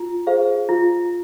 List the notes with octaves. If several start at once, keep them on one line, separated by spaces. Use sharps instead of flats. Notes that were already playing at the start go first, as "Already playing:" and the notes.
Already playing: F4
G#4 C5 F5
F4